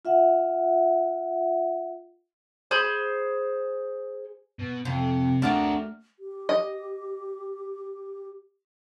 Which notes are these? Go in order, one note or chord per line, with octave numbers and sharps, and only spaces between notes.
F4 E5 F#5
G#4 C5 B5 G6
B2
F2 C3
A3 D4 F#4 G4 A#4 D5 F6
G4
D#5